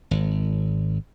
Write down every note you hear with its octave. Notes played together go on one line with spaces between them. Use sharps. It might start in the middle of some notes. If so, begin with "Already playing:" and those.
G#1